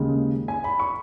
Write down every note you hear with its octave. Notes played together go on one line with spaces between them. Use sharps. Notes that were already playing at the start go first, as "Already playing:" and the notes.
Already playing: D#2 C#3 G#3
G#5
B5
C#6